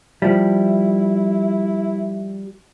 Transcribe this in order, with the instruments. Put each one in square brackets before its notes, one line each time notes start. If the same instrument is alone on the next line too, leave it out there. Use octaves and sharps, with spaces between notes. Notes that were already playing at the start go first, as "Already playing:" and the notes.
[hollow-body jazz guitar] F3 G3 [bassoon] E4